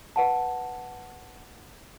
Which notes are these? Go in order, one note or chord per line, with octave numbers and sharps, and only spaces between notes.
B4 F#5 A5